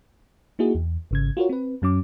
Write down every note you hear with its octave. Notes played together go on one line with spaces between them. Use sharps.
A#3 D#4 E4 F#4 G#4
E2
G#1 C#3 G#6
F4 F#4 A#4 C#5
C4 B4
F#2 F#3 C#4 D6